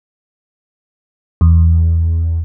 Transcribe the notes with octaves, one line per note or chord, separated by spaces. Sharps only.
E2